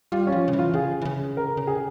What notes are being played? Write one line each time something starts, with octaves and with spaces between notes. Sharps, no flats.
G3 F4
C#4
F3
C#3
E3
F4
C#3 G#4
E3
C#3
A#4
C#3
G#4